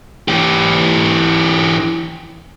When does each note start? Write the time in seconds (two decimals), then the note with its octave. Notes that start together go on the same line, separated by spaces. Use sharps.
0.28 E3 G4